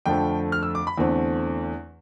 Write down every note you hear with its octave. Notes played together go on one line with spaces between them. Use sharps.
F2 D3 F3 A3 G5
F6
E6
D6
B5
E2 D3 A3 C4